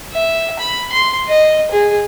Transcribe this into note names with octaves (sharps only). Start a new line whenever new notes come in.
E5
B5
C6
D#5
G#4